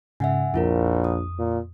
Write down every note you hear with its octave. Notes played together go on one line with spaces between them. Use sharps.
G#2 C#3 E5 F#5 G#5
A#1 F2 E4 F4 A#4
D#6
A#2